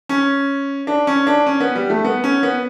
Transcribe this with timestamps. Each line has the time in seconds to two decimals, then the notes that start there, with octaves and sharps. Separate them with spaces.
0.09 C#4
0.87 D4
1.07 C#4
1.27 D4
1.47 C#4
1.60 B3
1.75 G3
1.90 A3
2.04 B3
2.24 C#4
2.43 B3